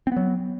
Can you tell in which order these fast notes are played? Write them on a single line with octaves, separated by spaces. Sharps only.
C4 B3 F#3